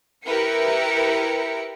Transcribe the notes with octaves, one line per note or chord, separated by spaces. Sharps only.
E4 G4 A#4 B4 C#7